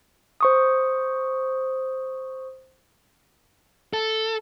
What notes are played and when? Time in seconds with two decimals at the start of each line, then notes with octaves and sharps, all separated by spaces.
0.41 C5 C#6 D#6
3.93 A4